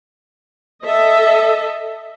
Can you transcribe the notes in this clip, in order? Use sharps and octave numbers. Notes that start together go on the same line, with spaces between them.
A4 D#5 E5